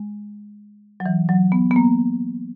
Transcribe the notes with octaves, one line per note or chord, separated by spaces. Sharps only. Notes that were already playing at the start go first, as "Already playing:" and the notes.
Already playing: G#3
F#3
E3
F#3
B3
B3
A#3